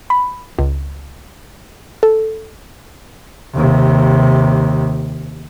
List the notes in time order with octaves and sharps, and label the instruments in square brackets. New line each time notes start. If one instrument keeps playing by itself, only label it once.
[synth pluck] B5
C#2
A4
[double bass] D#2 C3